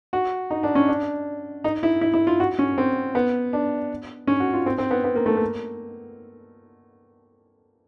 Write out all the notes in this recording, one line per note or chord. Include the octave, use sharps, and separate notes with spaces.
F#4
D#4
D4
C#4
D4
D#4
E4
E4
E4
F4
F#4
C#4
C4
B3
D4
C#4
F#4
F4
C4
C4
B3
B3
A#3
A3
A#3